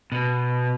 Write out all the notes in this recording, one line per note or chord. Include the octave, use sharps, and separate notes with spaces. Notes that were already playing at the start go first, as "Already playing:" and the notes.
B2